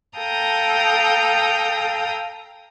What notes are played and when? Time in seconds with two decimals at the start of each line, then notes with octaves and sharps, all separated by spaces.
0.18 A4 F5 G5 A#5 D#6